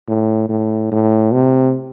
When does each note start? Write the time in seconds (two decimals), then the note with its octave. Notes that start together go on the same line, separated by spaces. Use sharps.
0.08 A2
0.49 A2
0.91 A2
1.33 C3